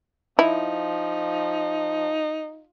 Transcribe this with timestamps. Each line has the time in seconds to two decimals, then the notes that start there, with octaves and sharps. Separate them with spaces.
0.39 F3 D#4 E4